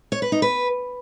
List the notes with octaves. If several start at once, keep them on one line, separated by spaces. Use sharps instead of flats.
C#5
B4
D#4
B4